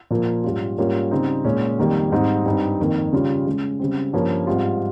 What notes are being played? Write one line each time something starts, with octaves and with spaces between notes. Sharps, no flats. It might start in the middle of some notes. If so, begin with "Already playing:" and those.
A#2 F3 A#3 F4
G#2 G3 C#4 F4
G#2 G3 A#3 C#4 F4
C#3 G3 C4 D#4
A#2 G#3 C#4
F2 D#3 G3 A#3
G#2 G3 C4 D#4
G2 G3 C4 D#4
F2 D#3 A#3 D#4
C#3 G3 C#4 F4
C#3 G#3 C#4
C#3 G3 C4
G2 F3 A#3 C#4
G#2 G3 C4 F4